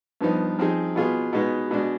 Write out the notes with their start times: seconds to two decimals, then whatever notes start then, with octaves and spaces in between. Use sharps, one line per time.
0.21 G2 F3 B3 D#4
0.59 F3 C4 D#4 G#4
0.96 B2 B3 F4 G#4
1.33 B2 G#3 B3 D#4
1.71 B2 G#3 D4